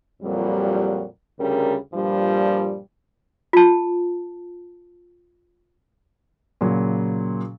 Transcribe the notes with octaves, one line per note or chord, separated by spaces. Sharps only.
F2 A#2 F#3 G3
D2 C#3 G3 A#4
G2 A#2 F3 G3
F4 A5
A#2 C#3 F#3